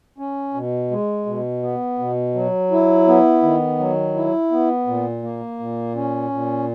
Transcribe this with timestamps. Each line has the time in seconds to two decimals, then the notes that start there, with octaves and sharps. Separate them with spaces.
0.18 C#4
0.54 B2
0.91 G#3
1.26 B2
1.62 B3
1.99 B2
2.35 F#3
2.71 E4
3.08 B3
3.42 D#3
3.79 F#3
4.15 E4
4.52 B3
4.87 A#2
5.23 A#3
5.59 A#2
5.95 C#4
6.31 A#2